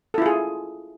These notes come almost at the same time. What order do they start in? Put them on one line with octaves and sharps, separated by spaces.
A4 E4 F4 G#4